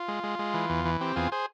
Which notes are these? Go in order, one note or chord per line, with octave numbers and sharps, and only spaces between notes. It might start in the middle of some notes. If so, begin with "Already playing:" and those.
Already playing: F4
G#3
G#3
G#3
E3
E2
E3
C4 G4
E2 F4 G#4
G#4 C5